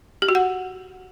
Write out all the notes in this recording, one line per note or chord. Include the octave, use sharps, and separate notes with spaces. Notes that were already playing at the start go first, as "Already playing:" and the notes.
G4
F#4
F#5